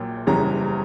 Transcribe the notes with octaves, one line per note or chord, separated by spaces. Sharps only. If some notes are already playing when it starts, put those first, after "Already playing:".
Already playing: A#1 A#2 F#3 G5
F#1 E2 C#3 E3 G3 A#5